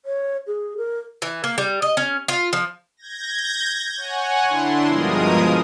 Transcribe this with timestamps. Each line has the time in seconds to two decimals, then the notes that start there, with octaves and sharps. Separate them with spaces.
0.06 C#5
0.47 G#4
0.77 A#4
1.22 E3
1.44 A#3
1.58 G3
1.82 D#5
1.97 C#4
2.28 F4
2.53 F3
2.97 G6 G#6 A#6
3.97 C#5 F#5 G#5
4.48 D3 D4 E4 C6
4.86 G2 B2 F3 G#3 A#4 D#6